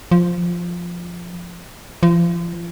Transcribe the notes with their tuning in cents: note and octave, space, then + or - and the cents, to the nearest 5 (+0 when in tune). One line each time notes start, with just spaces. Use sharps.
F3 +0
F3 -35